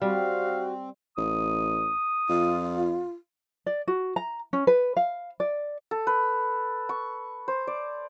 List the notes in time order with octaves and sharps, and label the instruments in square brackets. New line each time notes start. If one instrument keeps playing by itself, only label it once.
[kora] G3 [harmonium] C4 [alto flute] F#4 [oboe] F5
[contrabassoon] A1 [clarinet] D#6
[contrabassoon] F2 [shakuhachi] F4
[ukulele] D5
F#4
A#5
C#4
B4
F5
D5
[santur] A4
B4
C#6
C5
D5